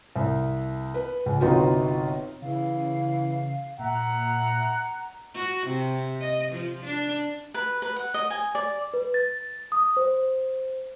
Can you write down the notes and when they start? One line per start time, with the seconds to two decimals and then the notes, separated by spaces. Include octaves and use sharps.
0.15 C2
0.94 B4
1.26 C#2
1.41 G1 C3 D#4 F4 F#4 B4
2.42 C#3 E3 F5
3.79 A#2 E5 F#5 A#5
5.34 F#4
5.66 C3
6.21 D#5
6.52 F3
6.84 D4
7.54 B4
7.82 B4
7.96 F#5
8.14 D#5
8.30 G#5
8.55 D5
8.94 B4
9.14 A6
9.72 D#6
9.97 C5